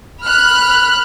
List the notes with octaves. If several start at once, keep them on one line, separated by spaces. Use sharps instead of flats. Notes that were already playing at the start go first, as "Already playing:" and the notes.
B5 F6 F#6